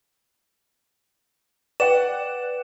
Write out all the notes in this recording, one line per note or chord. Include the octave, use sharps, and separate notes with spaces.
B4 D5 F#5 G5 E7